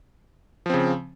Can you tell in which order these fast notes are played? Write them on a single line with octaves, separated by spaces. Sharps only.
F3 C4 C#3